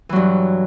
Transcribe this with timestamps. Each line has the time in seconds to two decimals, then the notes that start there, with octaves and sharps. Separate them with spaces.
0.09 E3
0.13 F#3
0.16 G2